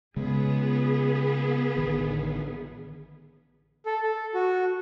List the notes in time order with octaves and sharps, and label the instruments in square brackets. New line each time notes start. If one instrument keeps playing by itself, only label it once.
[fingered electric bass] C#3 G#3 [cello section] B3 G#4
[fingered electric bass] A1 D3 D#3
[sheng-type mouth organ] A4
A4
F#4